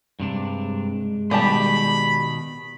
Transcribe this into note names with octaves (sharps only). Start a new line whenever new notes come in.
G2 C3 G#3 D4
B2 D#3 G3 G4 A5 B5